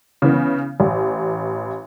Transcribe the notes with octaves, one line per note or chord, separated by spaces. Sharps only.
C#3 E3 B3
A1